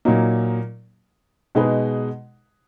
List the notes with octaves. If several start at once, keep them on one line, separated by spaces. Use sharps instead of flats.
A#2 F#3 A#3 D#4
B2 G#3 D#4 G#4 B4